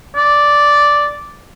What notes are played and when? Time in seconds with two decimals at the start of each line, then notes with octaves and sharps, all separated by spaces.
0.16 D5